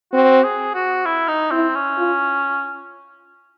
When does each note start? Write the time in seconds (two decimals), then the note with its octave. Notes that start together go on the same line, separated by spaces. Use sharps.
0.13 C4 F#4
0.44 G#4
0.75 F#4
1.05 E4
1.28 D#4
1.51 C4 E4
1.75 C#4
1.98 F4